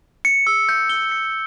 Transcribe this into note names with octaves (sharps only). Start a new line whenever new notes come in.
C#7
E6
G6
G7
C#7